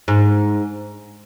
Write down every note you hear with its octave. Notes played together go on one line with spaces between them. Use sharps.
G#2